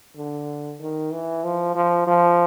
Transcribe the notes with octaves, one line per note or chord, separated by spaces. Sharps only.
D3
D#3
E3
F3
F3
F3